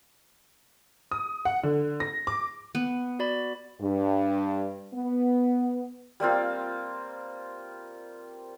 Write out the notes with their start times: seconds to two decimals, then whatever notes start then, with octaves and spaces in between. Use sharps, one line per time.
1.11 D#6
1.45 F#5
1.64 D3
2.00 A#6
2.27 D6
2.75 B3
3.19 F#4 D5 B5
3.80 G2
4.94 B3
6.20 G3 A#3 C4 F4